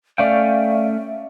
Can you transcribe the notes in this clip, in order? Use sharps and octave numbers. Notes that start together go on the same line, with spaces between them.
A3 C#4 D5 E5 F5 G5